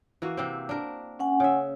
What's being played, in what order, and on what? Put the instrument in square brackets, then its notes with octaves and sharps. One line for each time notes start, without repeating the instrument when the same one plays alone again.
[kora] E3 A#3 F#4
C3 C4
D4 A#4
[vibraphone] C#4 F#5 G#5
[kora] C#3 E5